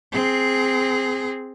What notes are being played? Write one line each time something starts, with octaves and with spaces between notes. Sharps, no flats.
C4 G#4